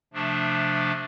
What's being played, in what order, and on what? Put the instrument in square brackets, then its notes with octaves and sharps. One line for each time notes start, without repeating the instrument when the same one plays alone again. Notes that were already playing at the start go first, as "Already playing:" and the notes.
[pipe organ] C3 F3 A3 D4